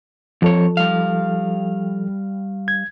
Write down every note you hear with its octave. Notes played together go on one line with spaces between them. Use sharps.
F2 F3 A4 C#5
G3 F5
G#6